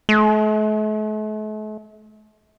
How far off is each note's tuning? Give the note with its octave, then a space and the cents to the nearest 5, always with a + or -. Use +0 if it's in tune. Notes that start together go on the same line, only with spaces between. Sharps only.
A3 -45